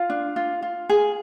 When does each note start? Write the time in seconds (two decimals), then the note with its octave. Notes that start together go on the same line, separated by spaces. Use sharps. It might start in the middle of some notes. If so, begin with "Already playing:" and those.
Already playing: F4 F5
0.10 D4
0.36 F4
0.62 F4
0.89 G#4